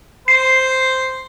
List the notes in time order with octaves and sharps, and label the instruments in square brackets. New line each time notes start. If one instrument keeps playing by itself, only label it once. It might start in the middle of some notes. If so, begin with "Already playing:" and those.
[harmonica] C5 [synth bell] C7